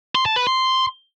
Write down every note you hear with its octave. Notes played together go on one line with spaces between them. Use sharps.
C6
A5
B4
C6